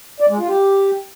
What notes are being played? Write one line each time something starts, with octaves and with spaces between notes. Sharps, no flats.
D5
G#3
F4
G4